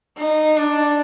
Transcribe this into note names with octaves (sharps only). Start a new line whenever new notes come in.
D#4
D4